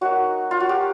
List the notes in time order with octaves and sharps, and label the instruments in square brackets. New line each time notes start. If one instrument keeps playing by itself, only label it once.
[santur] F#3 A#3 D#4 F#4
F4
F#4
G4